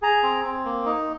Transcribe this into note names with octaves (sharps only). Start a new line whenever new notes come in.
G#4 A#5
C4
C4
A#3
D#4